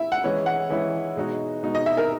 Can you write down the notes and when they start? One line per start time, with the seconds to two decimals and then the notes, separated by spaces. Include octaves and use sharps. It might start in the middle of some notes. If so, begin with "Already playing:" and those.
Already playing: E4 E5
0.12 F#5
0.23 E3 G#3 C#4 E4
0.46 F#5
0.70 E3 G#3 C#4 E4
1.16 B2 G#3 D#4 F#4
1.63 B2 G#3 D#4 F#4
1.75 D#5
1.86 E5
1.97 A#4